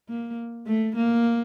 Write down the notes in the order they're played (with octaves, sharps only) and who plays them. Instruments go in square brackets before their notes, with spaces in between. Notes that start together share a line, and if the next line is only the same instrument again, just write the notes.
[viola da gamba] A#3
A3
A#3